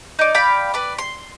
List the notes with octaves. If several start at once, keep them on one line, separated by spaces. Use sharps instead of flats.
D#4 D5
D5 F5 G5 B5
B4 D5
C6